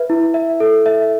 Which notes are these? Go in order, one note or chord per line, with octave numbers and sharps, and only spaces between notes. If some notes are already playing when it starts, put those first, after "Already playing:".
Already playing: B4 E5
E4
E5
A4
E5